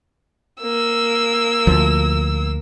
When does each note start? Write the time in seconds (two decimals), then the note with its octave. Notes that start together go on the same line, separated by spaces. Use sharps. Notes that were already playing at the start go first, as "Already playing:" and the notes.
0.62 A#3 E6
1.67 D2 F3